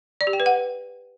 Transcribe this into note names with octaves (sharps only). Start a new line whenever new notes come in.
D5
G4
G5
B4
F#5